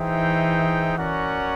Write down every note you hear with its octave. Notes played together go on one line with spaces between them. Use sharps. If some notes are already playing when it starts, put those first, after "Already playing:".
Already playing: E3 D#4 G#4 C5 E5 G5
C#4 F#4 A#4 D5 F#5